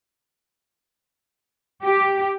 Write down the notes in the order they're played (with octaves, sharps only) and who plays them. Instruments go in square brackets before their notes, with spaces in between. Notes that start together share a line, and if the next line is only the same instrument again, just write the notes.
[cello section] G4